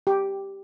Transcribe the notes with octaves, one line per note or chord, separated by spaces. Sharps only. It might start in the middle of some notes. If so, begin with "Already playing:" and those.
G4